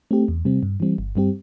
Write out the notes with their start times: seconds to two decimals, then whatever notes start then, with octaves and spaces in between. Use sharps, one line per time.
0.11 A3 C4 G4
0.28 E2
0.45 C3 G3 C4
0.63 G2
0.80 E3 G3 C4
0.98 G1
1.15 G2 G3 C4 G4